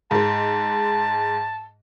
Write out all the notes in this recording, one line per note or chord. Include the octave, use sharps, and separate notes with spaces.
G#2 G#3 A5